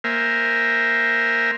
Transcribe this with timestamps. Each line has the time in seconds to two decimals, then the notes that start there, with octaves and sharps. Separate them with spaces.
0.04 A#3 A#4 C5 E5 G#5